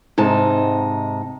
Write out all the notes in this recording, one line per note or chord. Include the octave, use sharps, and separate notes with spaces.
G#2 C3 D#4 A5